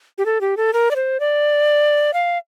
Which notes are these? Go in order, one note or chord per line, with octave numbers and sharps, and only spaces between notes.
G4
A4
G4
A4
A#4
D5
C5
D5
F5